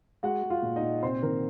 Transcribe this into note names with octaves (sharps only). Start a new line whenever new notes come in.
G#3 F#4 F#5
G#3
F4 F5
A#2
D#4 D#5
A#2
C3 C4 C5
D#3 A#3 A#4